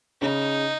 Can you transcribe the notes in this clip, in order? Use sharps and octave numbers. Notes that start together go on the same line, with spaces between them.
C#3 D#4